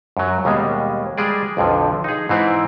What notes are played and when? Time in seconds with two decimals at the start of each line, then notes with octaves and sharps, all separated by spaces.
0.17 F#2 F#3
0.45 D#2 B2 G3 G#3
1.18 G3 G#3 G#4 D5
1.57 B1 F2 D3 F3
2.04 D#4 G#4
2.29 G#2 E3 C4 E4